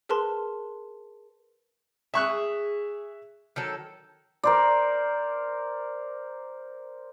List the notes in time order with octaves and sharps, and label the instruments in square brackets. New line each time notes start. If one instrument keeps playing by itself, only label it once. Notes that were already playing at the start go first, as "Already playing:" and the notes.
[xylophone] G#4 A#4 B4 A5 C6
[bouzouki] G#4 [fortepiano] E5 C#6 F#6
[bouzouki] D#3 F#3 A4
[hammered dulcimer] A#4 C5 D5